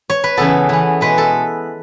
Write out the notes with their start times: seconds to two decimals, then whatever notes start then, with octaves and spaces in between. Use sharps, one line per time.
0.10 C#5
0.24 B4
0.37 C#3 E3 B3 A4
0.69 E3 B3
1.01 B2 G#3 B3 B4
1.18 A4